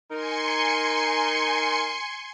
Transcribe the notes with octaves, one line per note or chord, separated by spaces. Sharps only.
D#4 A#4 G#5 C6 C#7